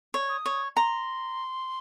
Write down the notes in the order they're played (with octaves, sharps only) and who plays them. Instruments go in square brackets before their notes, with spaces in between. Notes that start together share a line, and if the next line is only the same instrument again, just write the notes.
[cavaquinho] C#5
[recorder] D#6
[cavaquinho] C#5
[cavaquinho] A#5 [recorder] C6